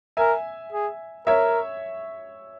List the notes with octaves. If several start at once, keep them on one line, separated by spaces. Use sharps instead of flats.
A#4 E5 G#5
G#4
A#4 C#5 E5